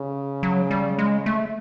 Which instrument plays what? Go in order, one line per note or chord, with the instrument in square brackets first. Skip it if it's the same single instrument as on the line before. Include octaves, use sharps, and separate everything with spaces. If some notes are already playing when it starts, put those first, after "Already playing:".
Already playing: [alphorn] C#3
[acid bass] F#3
G3
G#3
A3